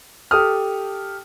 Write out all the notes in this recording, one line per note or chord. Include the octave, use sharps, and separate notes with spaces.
G4 A4 D#6 F6